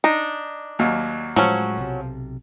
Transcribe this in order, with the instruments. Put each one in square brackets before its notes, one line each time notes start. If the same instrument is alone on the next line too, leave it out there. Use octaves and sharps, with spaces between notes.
[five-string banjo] D4 D#4
[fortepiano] D#2 F#3
[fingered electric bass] A2 G#3 [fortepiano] F3 [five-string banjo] F#3 C#4
[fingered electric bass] B1 C3